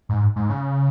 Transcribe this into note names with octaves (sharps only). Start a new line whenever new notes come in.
G#2
G#2
C#3